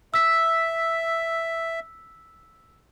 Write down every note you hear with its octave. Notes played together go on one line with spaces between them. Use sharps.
E5 E6 B6